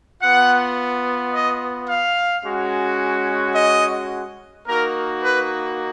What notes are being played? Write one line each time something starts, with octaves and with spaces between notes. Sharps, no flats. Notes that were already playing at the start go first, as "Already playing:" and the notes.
B3 F4 F#5
D#5
F5
G#3 C#4 F#4
D#5
A#3 D#4 F#4 A#4
B4